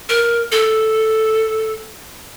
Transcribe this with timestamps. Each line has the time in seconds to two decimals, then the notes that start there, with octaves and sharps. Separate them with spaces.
0.09 A#4
0.52 A4